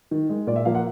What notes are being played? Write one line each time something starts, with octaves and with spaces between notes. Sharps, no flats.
D#3
G#3
A#2 D5
E5
F3 A#3 F5
F#5